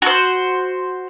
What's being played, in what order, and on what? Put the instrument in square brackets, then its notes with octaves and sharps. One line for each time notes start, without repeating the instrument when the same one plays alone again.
[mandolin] F#4 C5